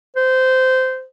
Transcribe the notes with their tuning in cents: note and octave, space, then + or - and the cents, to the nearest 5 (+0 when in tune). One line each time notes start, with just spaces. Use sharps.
C5 -15